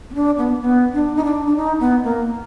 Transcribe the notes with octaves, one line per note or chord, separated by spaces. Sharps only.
B3
D4
B3
B3
D4
D#4
D4
D4
D#4
B3
A#3